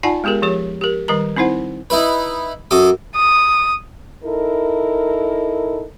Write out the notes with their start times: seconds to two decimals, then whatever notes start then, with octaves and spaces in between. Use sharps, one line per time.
0.03 D#4 F4 D5 F#5 G#5 A5
0.24 G#3 B3 G4 G#4 A#4
0.42 F3 G4 G#4 C#5
0.81 G4 A#4
1.08 D#3 G3 A#4 A#5
1.36 C4 D#4 E4 C5 F#5
1.90 D#4 E4 B4
2.71 F#2 A4 D6 D#6
3.16 D#6
4.24 D#4 E4 A4 A#4